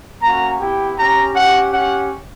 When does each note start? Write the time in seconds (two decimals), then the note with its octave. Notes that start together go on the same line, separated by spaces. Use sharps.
0.22 A#3 C#4 F#4 A#5
0.59 B3 E4 G4 G5
0.97 C#4 G4 A#5
1.34 C#4 G4 F#5
1.72 C#4 G4 F#5